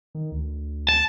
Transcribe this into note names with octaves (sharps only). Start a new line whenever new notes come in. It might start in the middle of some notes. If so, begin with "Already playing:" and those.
D#3
D2
A5